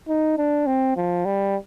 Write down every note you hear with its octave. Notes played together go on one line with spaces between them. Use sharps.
D#4
D4
C4
F3
G3